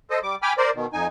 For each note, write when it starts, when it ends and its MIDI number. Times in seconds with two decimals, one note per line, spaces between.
0.10 0.19 69
0.10 0.19 72
0.10 0.19 75
0.23 0.35 55
0.23 0.35 86
0.42 0.53 79
0.42 0.53 80
0.42 0.53 83
0.42 0.53 86
0.42 0.53 89
0.57 0.70 70
0.57 0.70 72
0.57 0.70 74
0.75 0.86 47
0.75 0.86 51
0.93 1.07 41
0.93 1.07 63
0.93 1.07 80